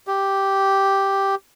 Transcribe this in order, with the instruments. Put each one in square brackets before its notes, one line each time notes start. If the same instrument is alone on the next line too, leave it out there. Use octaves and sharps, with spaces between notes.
[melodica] G4